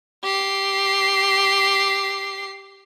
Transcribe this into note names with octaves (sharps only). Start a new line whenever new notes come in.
G4 C7